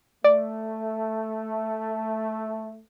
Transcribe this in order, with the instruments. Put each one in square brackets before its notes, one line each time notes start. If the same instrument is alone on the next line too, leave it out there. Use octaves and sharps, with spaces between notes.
[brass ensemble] A3 [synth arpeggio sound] D5